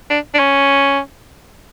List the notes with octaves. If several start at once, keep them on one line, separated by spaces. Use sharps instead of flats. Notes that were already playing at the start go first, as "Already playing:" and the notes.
D4
D4
C#4